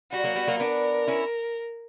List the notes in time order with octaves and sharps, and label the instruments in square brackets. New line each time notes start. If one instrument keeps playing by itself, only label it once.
[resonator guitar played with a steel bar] G3 [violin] F#4
[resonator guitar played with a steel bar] F#3 A#3
G3 B3
F#3 A#3
[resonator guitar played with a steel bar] B3 D4 [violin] A#4
[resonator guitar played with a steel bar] C#4 E4